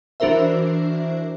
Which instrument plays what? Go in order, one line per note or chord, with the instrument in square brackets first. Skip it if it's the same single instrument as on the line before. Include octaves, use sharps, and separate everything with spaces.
[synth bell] E3 D4 F#4 A#4 C5 E5